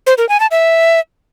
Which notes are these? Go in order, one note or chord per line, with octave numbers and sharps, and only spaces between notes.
C5
A#4
G#5
A5
E5